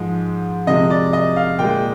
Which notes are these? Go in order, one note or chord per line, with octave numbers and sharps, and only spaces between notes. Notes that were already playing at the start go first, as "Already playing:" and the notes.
Already playing: G#2 F3 G#3
C3 F3 G#3 D#5
D5
D#5
F5
A#2 G#3 G5